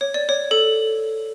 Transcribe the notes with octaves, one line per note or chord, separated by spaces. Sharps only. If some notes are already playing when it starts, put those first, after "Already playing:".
C#5
D5
C#5
A4